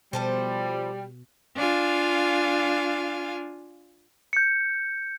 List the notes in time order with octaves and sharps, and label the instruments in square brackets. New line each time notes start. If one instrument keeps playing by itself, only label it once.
[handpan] B2 [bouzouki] F3 A4 C5 [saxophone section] G3
[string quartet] D4 F4 F5 G#5
[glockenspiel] G6 C#7